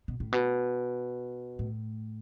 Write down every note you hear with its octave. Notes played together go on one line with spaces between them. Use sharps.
B2
A2
B2
A2